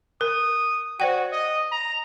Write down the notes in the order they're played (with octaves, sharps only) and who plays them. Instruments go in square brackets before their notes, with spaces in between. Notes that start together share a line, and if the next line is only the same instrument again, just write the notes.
[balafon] A#4 [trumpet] D#6
[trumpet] F#4 [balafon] C5 D5 G5
[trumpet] D#5
A#5